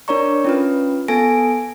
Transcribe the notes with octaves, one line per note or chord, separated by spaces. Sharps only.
D4 A#4 C#5 D5 A#5 C#6
C#4 F4 B4
B3 A4 G#5 A#6 D7